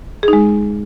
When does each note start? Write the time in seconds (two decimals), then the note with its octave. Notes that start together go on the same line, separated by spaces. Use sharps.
0.23 G#4
0.28 D#4
0.33 G#3